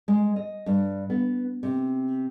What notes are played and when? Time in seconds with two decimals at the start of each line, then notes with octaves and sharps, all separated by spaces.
0.08 G#3
0.36 D#5
0.66 G2
1.10 B3
1.63 C3